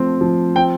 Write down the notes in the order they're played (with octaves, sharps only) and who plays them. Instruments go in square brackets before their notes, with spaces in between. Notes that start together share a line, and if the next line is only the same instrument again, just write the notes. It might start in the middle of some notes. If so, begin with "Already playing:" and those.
Already playing: [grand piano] F3 A3 C4
F3
C4 G5